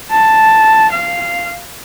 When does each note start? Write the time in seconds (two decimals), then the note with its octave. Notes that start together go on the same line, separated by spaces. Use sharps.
0.11 A5
0.91 F5